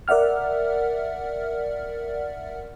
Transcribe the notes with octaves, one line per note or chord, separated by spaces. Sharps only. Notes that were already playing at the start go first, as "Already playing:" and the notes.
A#4 D5 E5 F#5 F6